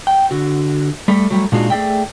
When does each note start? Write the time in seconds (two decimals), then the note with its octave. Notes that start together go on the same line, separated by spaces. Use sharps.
0.07 G5
0.31 D3 F#4
1.08 G3 A3
1.30 F#3 G3 A3
1.52 A#2 G#3 D4 D#4 F4 F#4
1.70 A3 G#4 A4 D5 E5 G5